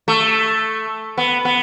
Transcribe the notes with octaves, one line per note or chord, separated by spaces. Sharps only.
A3
B3
B3